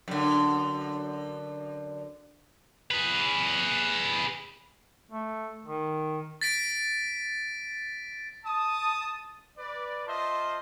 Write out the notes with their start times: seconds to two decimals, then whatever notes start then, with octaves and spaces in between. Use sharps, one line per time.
0.08 F#2 D3
2.91 G#4 B4
5.11 A3
5.66 D#3
6.41 A6 B6 D7
8.45 A5 D#6
9.57 B4 D5
10.07 F4 C5 D#5 E5 A5 C6